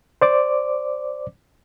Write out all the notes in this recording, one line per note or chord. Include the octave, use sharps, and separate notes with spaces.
C5 D5 D6